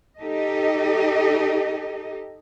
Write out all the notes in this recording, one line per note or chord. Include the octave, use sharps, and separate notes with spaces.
D#4 G4 A4 D#5